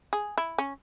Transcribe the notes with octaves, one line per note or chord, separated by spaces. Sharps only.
G#4
E4
C#4